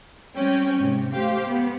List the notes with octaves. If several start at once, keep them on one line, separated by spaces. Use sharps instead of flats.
G3 C4 C#4 C#5 G5
G#2 C3
A3 G4 C5 F5 G5
B3